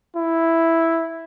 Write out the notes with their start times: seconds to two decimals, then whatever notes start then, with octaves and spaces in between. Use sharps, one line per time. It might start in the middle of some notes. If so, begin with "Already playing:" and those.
0.16 E4